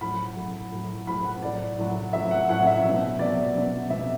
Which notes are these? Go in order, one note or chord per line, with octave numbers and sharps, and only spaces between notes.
A2 F#3 B5
A2 F#3
A2 F#3
A2 F#3 B5
F#5
A2 F#3 D5
A2 F#3
A2 F#3 E5
F#5
A2 F#3 F#5
E5
F#3
B2
B2 F#3 D5
B2 F#3
B2 F#3 E5